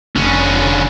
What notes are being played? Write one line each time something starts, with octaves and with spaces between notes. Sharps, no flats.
F1 D3 C#4